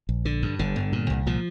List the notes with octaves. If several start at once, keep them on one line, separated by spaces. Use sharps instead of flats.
A#1
D3
G2
G1 D3
G1
A#2
C2
A#2 F3